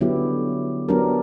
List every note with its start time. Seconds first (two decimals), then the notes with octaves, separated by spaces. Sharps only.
0.01 D3 F#3 B3 E4 G4
0.89 F#3 B3 D4 G4 A#4